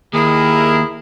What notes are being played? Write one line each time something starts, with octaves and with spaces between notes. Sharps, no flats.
D#2 E4 G#4 A#4